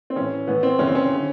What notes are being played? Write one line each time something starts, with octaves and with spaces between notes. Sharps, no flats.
C4
A2 E3 C#4
A2 E3 B3
C4
F#2 C#3 E3 C#4
C4
C#4
D3